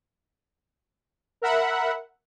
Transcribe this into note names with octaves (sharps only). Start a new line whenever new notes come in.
A#4 E5 F#5 B5